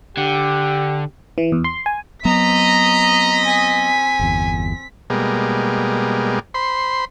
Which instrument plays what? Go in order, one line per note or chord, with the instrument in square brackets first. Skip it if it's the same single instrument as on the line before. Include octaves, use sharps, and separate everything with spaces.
[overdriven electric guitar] D3 [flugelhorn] G4
[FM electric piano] E3
E2
C6
G#5
[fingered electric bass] F#3 B3 [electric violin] C4 B6 [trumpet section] D#5 [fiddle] A#5
[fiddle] G#5
[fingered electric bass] G1 E2
[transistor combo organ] B2 G3 G#3 A#3
C5 B5 C6